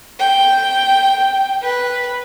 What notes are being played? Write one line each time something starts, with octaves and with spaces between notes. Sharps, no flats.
G5
B4